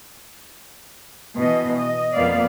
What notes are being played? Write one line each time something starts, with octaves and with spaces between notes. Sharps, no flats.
B2 E3 D#5
D#5
F2 F3 A#3 B3 D5 F5